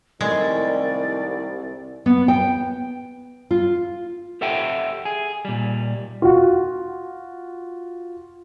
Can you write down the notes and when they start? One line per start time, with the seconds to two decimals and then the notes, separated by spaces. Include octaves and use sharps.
0.21 C2 D#3 G#3 A3 E4 D5
2.06 B3
2.28 G5
3.51 F4
4.41 G4 A4 E5 F#5 G5
5.05 G#4
5.45 A#2 G3
6.22 F4 F#4